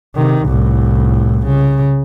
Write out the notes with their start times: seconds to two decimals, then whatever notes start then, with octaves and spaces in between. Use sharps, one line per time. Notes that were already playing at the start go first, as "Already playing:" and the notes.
0.15 C3 D#3
0.45 C2 A2
1.45 C#3